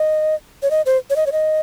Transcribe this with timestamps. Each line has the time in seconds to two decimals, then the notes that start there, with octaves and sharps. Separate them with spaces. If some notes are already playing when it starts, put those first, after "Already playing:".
Already playing: D#5
0.63 C#5
0.71 D#5
0.86 C5
1.10 C#5
1.16 D#5
1.26 C#5
1.32 D#5